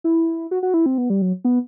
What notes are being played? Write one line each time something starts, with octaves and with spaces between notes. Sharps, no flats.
E4
F#4
F#4
E4
C4
B3
G3
F#3
B3